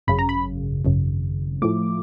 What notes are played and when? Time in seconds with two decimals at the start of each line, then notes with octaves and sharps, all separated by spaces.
0.07 G#1 F#2 C#3 B5
0.19 A#5
0.29 B5
0.85 G#1 F#2 C#3
1.62 A2 F3 A3 D6